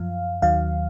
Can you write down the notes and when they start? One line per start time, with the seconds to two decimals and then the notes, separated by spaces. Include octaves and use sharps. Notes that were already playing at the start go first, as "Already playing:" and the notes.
Already playing: F#2 F3 F5
0.42 D#2 D#3 F#3 F5